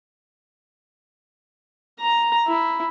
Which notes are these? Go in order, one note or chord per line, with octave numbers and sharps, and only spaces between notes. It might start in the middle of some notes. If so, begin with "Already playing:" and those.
A#5
E4